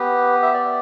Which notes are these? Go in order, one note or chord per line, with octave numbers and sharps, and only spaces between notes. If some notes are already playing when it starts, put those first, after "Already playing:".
Already playing: B3 G4 B4
E5
D5